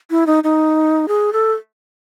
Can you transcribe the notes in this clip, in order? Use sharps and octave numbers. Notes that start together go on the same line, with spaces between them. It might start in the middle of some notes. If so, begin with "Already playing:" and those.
E4
D#4
D#4
G#4
A4